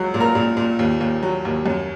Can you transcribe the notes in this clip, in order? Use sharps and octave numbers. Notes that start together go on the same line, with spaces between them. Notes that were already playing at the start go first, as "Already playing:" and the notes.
Already playing: C#2 F#3
A#2
A#4 A#5
A#2
A#2
D#2
D#2
F#3
D#2
F#2